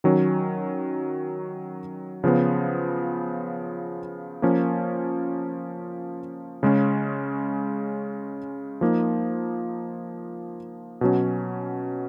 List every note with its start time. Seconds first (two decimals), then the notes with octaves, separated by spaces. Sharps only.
0.04 D#3 F#3 C#4
2.24 C#3 F3 B3
4.42 F3 A#3 C#4
6.63 C#3 G#3 C#4
8.81 F3 A#3 D#4
11.01 B2 F#3 C#4